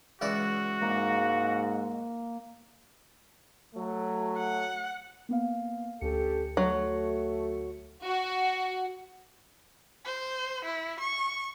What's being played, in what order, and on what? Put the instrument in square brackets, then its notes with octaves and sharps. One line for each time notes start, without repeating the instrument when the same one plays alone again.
[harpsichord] C#2 E3 D5 [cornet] F#4
[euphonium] G#2 [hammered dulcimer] A#3
[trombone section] F#3 A3
[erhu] F#5
[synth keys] A#3 B3 F5
[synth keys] D2 C#7 [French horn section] C#4 G4 A4
[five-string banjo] F#3 [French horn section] A3
[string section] F#4
[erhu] C5
E4
C#6